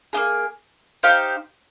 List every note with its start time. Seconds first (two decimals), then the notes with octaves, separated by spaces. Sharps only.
0.13 A#3 D#4 G#4
1.03 D#4 G4 C5 F5